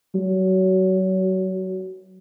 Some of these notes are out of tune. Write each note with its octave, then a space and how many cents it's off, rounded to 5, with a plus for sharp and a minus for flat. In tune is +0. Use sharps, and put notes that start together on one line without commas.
F#3 +25